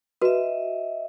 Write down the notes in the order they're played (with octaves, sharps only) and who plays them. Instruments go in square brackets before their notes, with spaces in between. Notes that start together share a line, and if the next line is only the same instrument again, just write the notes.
[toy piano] F#4 B4 [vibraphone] D#5 E5